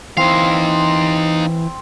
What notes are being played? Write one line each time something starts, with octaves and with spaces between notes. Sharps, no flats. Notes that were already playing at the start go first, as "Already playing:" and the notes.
E3 C4 D#4 F5